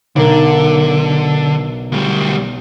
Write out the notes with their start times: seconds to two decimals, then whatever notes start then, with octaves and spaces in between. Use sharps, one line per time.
0.16 B1 D3 A#4 E7
1.92 D2 G3